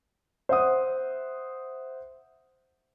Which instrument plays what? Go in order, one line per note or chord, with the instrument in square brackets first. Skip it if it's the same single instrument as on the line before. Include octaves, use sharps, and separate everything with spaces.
[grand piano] C5 E5 F#5 D#6